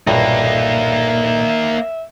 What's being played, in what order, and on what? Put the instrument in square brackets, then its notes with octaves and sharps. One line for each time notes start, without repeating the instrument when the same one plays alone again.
[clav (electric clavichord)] B1 G2 [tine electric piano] A#2 D5 A#5 [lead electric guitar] A#3 D#4 [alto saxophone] E5